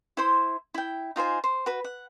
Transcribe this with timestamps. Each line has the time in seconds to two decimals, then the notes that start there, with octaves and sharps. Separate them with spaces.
0.17 E4 C5 C6
0.74 E4 G5
1.16 D#4 F4 C5 G#5
1.44 C5
1.66 F#4 B4
1.84 F#5